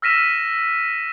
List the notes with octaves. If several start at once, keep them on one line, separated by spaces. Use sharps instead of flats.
E6 F6 A#6 B6 D#7 E7